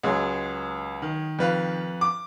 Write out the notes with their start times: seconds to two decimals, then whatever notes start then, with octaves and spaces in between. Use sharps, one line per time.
0.03 C#2 F#3 G#3
1.02 D#3
1.39 F2 B4 F5
2.01 D6